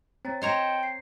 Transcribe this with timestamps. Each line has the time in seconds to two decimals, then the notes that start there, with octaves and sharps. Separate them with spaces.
0.25 C4 C#5 A#5 A6
0.42 C5 C#5 D#5 G5 A#5 C6 E7
0.83 C7